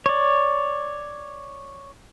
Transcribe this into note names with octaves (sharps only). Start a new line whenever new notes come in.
C#5 D5